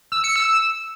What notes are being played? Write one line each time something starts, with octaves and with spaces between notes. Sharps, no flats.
E6
C#7
E6